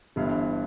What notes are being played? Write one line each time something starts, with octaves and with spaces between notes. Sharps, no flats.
G1 G2 E3